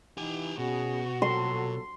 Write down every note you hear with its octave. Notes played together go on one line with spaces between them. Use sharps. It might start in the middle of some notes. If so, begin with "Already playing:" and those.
E3 D#4 G4 G#5
B2 C#4 F#4 G#4
A#2 F#3 A4 C6